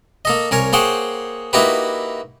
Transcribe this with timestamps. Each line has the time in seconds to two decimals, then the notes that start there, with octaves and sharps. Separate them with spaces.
0.25 A#3 A4 D#5
0.51 C2 A#4 C#5 G#5
0.73 A#3 G#4 C5 C#5 F#5 G5
1.53 A#3 D#4 E4 F#4 G4 B4